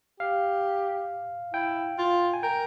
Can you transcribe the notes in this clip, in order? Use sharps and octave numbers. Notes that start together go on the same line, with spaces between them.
G4 F5
E4 G5
F4
G#5
A#4 G5